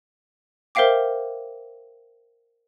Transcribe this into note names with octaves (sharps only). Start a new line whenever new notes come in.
A#4 C5 E5 F5 G5 D6